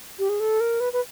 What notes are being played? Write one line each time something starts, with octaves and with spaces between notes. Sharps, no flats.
G4
G#4
A4
A#4
B4
B4